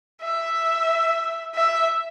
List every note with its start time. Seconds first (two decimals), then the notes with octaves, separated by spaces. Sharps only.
0.22 E5
1.55 E5